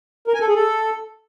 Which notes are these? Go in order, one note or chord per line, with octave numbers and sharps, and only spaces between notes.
A#4
G#5
A4
G#4
A4